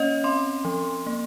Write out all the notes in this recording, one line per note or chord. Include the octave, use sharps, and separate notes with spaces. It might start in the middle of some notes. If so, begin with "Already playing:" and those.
Already playing: A#3 C#4 C#5 D#5
C4 C6
F3
A#3